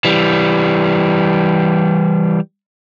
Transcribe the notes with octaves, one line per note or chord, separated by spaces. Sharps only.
E3 G3